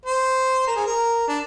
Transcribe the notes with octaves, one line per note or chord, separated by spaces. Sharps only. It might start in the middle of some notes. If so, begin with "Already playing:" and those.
C5
A#4
G#4
A#4
D4